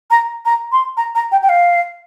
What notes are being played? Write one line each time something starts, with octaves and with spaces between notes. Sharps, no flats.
A#5
A#5
C6
A#5
A#5
G5
G5
F5